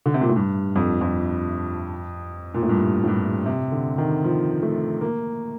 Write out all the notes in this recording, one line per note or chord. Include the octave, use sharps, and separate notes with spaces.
D3
C3
A#2
A2
G2
F2
F2
A#2
A2
G2
A2
G2
C3
D3
D#3
F3
A3
A#3